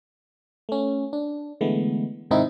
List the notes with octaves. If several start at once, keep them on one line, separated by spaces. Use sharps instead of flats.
A3 C#4
D4
D3 E3 G#3 A3 B3
G#2 C3 D#3 C4 D#4 E4